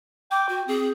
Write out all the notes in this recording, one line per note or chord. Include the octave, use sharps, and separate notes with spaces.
G5 D6
F#4
C4 G#4